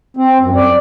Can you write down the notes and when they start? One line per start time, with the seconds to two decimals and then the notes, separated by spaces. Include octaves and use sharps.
0.17 C4
0.41 F#2
0.56 D5